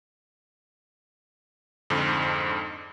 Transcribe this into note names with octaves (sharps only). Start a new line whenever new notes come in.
F2 G#2 D3 F3